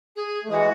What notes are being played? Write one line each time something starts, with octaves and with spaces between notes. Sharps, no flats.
G#4
A3
E3 G#3 F#4 G#4